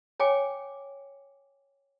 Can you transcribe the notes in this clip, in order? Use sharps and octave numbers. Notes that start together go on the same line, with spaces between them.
C#5 G5 G#5 D6